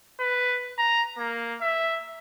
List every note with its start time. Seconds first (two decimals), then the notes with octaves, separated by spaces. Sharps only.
0.20 B4
0.78 A#5
1.18 A#3
1.61 E5